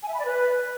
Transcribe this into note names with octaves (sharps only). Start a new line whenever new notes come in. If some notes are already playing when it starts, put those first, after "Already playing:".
G#5
E5
B5
D5
B4